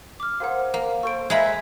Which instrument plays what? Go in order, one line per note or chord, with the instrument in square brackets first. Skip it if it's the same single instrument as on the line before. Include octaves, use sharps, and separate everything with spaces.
[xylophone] D6 F6
[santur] G#4 A#4 C5 [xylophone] F5 F#5
[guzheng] A#3
[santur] A4 C5 A5 [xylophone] C#6 D7
[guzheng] G#3 A#5 B5 [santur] B4 F5 [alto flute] E5 [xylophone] G#6